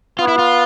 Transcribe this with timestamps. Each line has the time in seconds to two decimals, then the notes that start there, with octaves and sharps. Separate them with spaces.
0.19 B3 F4
0.28 E4
0.39 F4